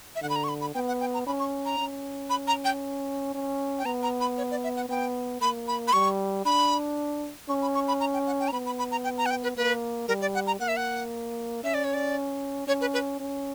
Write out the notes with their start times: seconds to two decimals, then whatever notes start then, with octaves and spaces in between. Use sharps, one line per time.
0.16 E5
0.22 D3 F#5
0.29 B5
0.36 A#5
0.44 C#6
0.49 B5
0.61 B5
0.75 B3 G5
0.88 F#5
1.01 G5
1.14 A#5
1.27 C#4 B5
1.39 C#6
1.65 A#5
1.78 C#4
2.30 B5
2.48 A#5
2.65 G5
3.35 C#4
3.79 G5
3.86 B3 A#5
4.03 A#5
4.21 B5
4.38 C#5
4.51 D5
4.64 E5
4.76 F#5
4.89 B3 G5
5.41 A#3 B5
5.68 B5
5.88 B5
5.93 G3 C#6
6.45 D4 B5
7.49 C#4 C#6
7.62 B5
7.75 C#6
7.88 B5
8.00 A#5
8.14 G5
8.27 F#5
8.40 G5
8.48 A#5
8.53 B3 B5
8.66 B5
8.79 B5
8.91 A#5
9.04 G5
9.18 A#5
9.26 F#5
9.31 G5
9.43 B4
9.57 A#3 B4
10.08 G3 A#4
10.22 D5
10.35 F#5
10.47 A#5
10.60 A#3 F#5
10.68 E5
10.77 F#5
11.64 C#4 E5
11.74 D5
11.84 C#5
11.94 D5
12.67 C#4 C#5
12.81 B4
12.94 B4
13.20 C#4